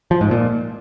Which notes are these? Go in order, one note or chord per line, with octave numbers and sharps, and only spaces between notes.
F3
G#2
A#2